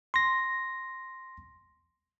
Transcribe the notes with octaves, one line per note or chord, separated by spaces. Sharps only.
C6 A#6